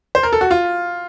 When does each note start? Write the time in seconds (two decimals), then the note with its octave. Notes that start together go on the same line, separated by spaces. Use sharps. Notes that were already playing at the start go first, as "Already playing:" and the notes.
0.15 C5
0.23 A#4
0.33 A4
0.41 F#4
0.51 F4